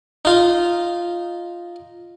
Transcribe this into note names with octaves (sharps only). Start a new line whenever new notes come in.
D#4 F4